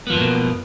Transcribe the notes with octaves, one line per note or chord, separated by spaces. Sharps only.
F#2 B2 F3 A#3 B3